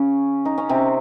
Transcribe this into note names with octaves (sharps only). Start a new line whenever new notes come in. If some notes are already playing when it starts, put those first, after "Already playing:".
Already playing: C#3 C#4
D#4
C#4
C3 C4